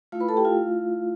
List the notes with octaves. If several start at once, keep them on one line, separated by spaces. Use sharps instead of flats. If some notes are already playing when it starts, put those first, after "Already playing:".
A3 E4 F4 F5
B4 B5
A4 A5
G4 G5
F4 F5